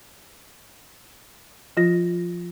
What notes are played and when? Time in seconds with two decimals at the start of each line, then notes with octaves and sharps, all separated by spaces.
1.77 F3 F4 A#6